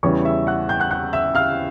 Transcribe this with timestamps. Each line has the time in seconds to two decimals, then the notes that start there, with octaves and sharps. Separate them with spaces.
0.03 E2 C#3 E3 G3 C#5 C#6
0.25 E5 E6
0.47 F#5 F#6
0.69 G5 G6
0.80 F#5 F#6
0.91 F#5 F#6
1.13 E5 E6
1.35 F5 F6